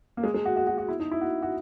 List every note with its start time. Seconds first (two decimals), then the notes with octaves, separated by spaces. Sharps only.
0.17 A#3
0.24 G#3
0.34 G#3
0.45 F#4
0.57 F#4
0.67 F#4
0.78 F#4
0.88 E4
1.00 D#4
1.11 E4
1.21 F#4
1.42 F#4